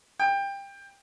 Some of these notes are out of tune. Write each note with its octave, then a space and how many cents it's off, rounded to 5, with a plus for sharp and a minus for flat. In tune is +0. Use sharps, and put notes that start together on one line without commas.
G5 +20